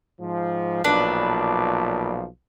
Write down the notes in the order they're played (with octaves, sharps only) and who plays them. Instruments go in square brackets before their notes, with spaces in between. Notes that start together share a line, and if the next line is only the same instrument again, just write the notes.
[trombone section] G#2 F3
[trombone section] B1 A#2 F3 [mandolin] D4 B4